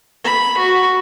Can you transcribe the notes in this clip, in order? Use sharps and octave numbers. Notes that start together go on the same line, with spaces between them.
B5
F#4